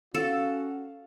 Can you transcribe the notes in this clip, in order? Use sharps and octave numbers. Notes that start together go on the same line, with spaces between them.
C#4 F#4 A4 F5